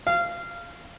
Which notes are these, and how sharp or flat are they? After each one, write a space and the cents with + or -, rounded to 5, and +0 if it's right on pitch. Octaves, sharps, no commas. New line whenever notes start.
F5 -20